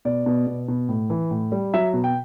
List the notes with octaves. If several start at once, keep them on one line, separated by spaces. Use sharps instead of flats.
B2 D5
B2
B2
B2
A2
E3
A2
G3
F#3 E5
B2
G5